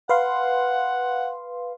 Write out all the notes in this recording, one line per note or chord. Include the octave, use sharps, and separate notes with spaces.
B4 F5 F#5 C6